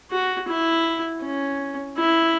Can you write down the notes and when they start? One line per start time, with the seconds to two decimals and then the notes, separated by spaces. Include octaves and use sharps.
0.11 F#4
0.48 E4
1.22 C#4
1.98 E4